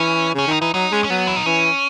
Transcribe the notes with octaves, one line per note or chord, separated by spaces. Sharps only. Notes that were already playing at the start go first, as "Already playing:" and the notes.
Already playing: E3 C#4
C#3 C#4
D#3 D#4
E3 D#4
F#3 D#4
G#3 C#4
C#4
F#3 B3
E4
D#4
E3 C#4